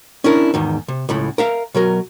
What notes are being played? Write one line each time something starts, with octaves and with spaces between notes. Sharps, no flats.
C#4 D4 E4 A#4
E2 G#2 D#3
C3
C#2 A2 B5
A#4 E5 F5
B2 F#3 A#4